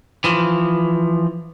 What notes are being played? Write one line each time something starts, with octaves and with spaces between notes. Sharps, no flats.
E3 F3